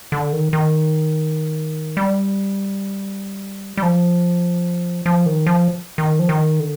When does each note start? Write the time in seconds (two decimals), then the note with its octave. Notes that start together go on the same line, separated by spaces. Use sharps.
0.12 D3
0.33 D#3
0.53 D#3
1.97 G3
3.77 G3
3.83 F3
5.06 F3
5.26 D#3
5.47 F3
5.98 D#3
6.19 F3
6.29 D#3
6.60 D3